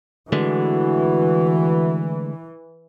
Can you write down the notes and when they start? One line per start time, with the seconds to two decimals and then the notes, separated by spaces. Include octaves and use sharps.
0.33 D3 E3 G#3 A3 F#4